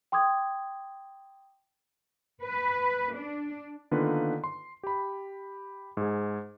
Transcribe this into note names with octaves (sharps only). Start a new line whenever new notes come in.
G5 C6 D6 D#6 G#6
B4
D4
D3 D#3 A#3 B3 F4 B4
C6
G4 B5
G#2 G#4